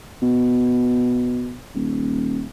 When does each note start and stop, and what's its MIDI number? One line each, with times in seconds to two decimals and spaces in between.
0.22 1.58 47
1.74 2.44 27